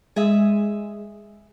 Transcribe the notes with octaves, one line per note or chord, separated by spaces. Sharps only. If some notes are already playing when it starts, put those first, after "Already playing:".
G#3 G#4 E5